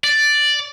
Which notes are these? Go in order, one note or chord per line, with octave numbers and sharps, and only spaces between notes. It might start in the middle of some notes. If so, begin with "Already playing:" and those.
D5